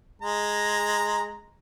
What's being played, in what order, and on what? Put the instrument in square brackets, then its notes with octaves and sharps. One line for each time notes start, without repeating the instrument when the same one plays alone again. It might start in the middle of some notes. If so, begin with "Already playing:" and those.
[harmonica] G#3 A#5